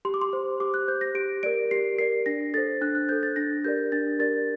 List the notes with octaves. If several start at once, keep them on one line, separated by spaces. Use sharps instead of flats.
G4 C6
D6
C6
C5
G4 D6
F#6
C5 G6
A#6
G4 D7
A#4 D5 D7
G4 C7
A#4 D5 C7
D4 A#6
A4 C5 A6
D4 F#6
F#6
A4 C5 G6
A6
D4 A#6
G4 A#4 D5 G6
D4 A6
G4 A#4 D5 A6